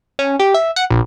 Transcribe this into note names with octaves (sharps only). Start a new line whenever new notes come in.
C#4
G4
E5
F#5
A#1